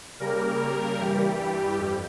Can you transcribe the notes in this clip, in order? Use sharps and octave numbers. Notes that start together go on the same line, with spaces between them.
C#3 G3 A#3 A#4
A#4
G2 E3 G3 G4
F2